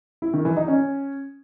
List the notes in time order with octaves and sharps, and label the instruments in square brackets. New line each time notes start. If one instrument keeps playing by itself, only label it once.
[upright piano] E4
D#3
E3
D#4
C#4